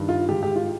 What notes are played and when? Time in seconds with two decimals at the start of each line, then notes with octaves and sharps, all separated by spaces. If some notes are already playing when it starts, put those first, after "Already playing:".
Already playing: G2 D#3
0.09 F4
0.29 G#2 D#3 G4
0.43 G4
0.56 F4